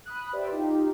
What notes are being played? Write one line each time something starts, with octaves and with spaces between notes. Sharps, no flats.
B5 D#6 F#6
G4 B4 C5 D5 E5
D#4 F4 G4